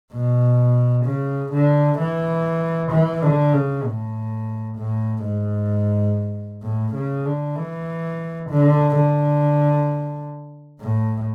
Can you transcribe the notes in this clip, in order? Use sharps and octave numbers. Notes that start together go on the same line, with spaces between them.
B2
C#3
D3
E3
E3
D3
C#3
A2
A2
G#2
A2
C#3
D3
E3
D3
D3
A2